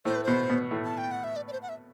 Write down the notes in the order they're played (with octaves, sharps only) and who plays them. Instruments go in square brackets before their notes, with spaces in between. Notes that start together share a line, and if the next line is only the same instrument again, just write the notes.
[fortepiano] A2 A3 [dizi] C5
[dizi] B4
[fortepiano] B2 B3 [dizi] C5
[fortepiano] B2 B3
A2 A3
[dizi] A5
G5
F#5
E5
D5
D5
C5
F#5
E5